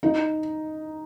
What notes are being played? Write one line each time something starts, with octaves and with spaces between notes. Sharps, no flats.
D#4